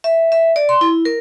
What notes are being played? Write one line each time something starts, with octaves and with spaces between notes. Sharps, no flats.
E5
E5
D5
C6
E4
A#4